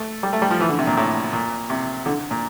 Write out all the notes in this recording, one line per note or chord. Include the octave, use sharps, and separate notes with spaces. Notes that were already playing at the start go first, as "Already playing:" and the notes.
Already playing: A3
G3
A3
G3
F3
E3
D3
C3
A#2
A2
A#2
C3
D3
A#2